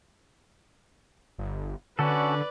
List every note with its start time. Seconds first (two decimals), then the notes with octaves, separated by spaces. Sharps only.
1.38 G1
1.99 D3 C#4 F#4 A4 B4 D5